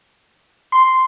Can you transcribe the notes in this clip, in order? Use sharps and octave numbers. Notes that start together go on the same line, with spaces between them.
C6